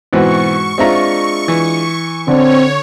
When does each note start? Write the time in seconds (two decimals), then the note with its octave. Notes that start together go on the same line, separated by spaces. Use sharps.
0.13 G#2 B2 E3 C4 F#4 C#6
0.78 G#3 C4 D4 F4 E5 A#5
1.48 E3
2.28 D3 C4 D4 C#5